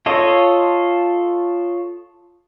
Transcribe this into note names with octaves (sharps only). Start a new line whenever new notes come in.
F4 A4 C#5 D#5